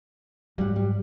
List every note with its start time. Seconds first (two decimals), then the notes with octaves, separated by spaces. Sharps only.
0.58 G#2 G3 F#5
0.76 G3